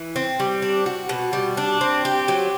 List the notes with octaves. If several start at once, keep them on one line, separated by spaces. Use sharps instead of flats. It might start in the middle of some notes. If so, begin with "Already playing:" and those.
Already playing: E3
C4
G3
D4
F#4
B2
G3
D4
C4
G4
F#3